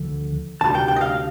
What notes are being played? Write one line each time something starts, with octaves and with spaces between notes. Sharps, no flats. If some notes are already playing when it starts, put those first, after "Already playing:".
Already playing: D2 D3 F3
D2 C3 G3 A5
G5
G5
D#5
F5